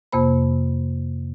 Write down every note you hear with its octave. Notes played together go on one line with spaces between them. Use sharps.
F2 C3 A#3 C5 B5